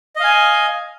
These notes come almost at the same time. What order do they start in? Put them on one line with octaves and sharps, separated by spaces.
D#5 F5 G#5